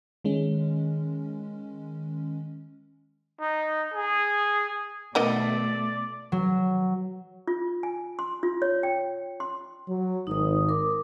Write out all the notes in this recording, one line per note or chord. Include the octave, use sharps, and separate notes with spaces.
D#3 G#3 C#4
D#4
G#4
B2 D#3 A3 B3 D5 D#5
F#3
F4
G#5
C6
F4
C#5
G5
C6
F#3
G#1 D#4 D#6
A#4 D6